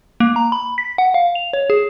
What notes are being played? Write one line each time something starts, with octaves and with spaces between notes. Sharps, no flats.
A#3
A#5
B5
B6
F#5
F5
F7
C#5
G#4